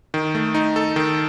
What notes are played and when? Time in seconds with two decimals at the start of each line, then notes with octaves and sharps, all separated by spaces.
0.14 D#3
0.35 A3
0.55 D#4
0.76 A4
0.96 D#3